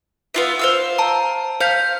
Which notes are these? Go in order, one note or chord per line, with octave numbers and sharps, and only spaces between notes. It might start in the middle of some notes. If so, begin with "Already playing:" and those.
B3 F4 E5
C5 F5 E6
A5 A#5
C5 F5 G6 B6